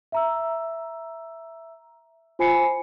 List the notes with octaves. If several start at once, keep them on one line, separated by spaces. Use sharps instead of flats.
E5 A#5 E6
F4 C5 G#5 B5 C7 C#7